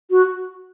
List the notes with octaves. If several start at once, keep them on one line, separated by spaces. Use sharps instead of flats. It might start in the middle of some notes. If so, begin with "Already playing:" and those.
F#4